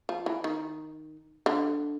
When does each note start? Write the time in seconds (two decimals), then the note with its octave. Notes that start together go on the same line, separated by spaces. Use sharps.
0.09 F3
0.26 E3
0.44 D#3
1.46 D3